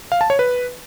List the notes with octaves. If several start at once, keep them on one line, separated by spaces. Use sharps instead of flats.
F5
A5
C#5
B4